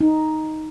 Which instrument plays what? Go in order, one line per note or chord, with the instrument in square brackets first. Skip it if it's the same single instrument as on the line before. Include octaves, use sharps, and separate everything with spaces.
[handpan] D#4